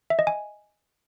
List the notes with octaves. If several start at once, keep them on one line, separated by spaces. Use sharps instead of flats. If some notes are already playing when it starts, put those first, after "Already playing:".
E5
D#5
G#5